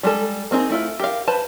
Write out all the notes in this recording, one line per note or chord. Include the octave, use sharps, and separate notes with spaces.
G3 G#3 A4
A#3 C4 D#4 G#4
A3 E4 F4
G4 A#4 F5
B4 C5 A5 B5